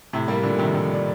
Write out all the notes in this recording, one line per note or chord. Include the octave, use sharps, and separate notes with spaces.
A2 C3
G3 A#3
A#2 D3
C3 D#3
D3 F3
D4